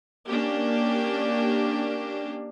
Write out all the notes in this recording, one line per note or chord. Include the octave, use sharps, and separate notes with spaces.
A#3 C#4 D4 G4